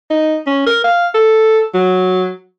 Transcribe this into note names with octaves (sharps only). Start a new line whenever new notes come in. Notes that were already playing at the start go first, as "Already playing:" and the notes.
D#4
C#4
A#4
F5
A4
F#3